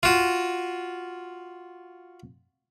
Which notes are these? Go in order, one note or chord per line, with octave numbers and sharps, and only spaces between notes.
F4 F#4